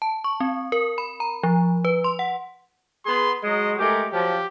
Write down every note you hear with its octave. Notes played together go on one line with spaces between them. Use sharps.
A5
C#6
C4
A#4
B5
A#5
F3
B4
C6
F#5
B3 G#4 C6
F#3 G#3 D#5
G#3 A3 G4 A#4
F3 F#3 G4